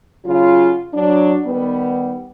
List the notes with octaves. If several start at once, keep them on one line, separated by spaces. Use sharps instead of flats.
C#3 F#3 F4
F#3 D4
D#3 G3 B3